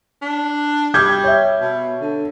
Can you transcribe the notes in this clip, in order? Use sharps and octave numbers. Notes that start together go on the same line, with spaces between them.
D4
G3 D6 G6 G#6
C#5 E5
B2
D3